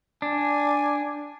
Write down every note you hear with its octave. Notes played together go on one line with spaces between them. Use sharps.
D4 G#5